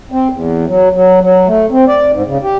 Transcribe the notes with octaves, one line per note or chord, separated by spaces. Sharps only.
C4
E2
F#3
F#3
F#3
A3
C4
D5
G#2
C#3
G4